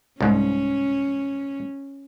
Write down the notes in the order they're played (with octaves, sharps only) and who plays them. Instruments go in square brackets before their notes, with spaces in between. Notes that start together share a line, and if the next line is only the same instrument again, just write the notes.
[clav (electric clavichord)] C2 G#2 [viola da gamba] C#4